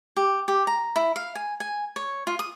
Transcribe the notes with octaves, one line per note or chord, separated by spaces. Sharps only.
G4
G4
A#5
E4
F5
G#5
G#5
C#5
F4
D#6